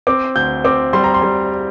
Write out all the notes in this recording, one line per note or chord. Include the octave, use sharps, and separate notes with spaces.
C4 D6
D2 G6
C4 D6
G3 C6
A#5
C6
G3